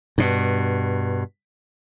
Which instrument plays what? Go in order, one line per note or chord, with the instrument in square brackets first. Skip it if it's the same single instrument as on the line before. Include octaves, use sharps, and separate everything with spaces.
[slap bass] G2 B2